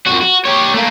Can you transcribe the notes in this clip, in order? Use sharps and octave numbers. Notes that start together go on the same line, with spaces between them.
F2 F#4
F#4
G4 C#5
A3 A#3